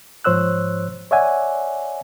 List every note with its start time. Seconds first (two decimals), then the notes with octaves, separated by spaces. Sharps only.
0.24 G#2 F3 C5 C#5 E6 F#6
1.11 C#5 D5 E5 F#5 G#5